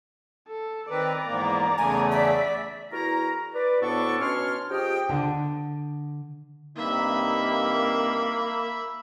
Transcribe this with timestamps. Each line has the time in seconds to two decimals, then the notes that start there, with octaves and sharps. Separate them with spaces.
0.48 A4
0.90 D#3 C4 B4 D5 A#5
1.26 E2 G#2 A#3
1.78 E2 C#3 A3 G#5
2.11 D5 E5 B6
2.91 E2 E4 F#4 A#4 A#5
3.54 B4 D5
3.80 D2 A2 B3 D4 A4 C#6
4.19 B2 C#4 D4 C#5 C6 F6
4.70 F3 G4 G#4 D#5 G5
5.09 D3
6.77 G2 C3 A#3 D#4 E5 B5